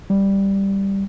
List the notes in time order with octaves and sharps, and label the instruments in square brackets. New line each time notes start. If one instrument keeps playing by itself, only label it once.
[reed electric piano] G3